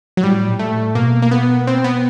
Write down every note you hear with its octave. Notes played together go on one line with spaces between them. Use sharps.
F#3
A2 G3
A#2
A3
A2
B2 A#3
A#3
B3
C4
B3